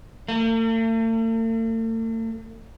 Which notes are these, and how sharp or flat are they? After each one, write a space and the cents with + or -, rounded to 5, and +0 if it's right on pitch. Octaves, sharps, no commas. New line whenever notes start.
A3 +45